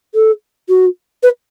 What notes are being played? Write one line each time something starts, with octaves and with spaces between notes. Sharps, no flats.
A4
F#4
B4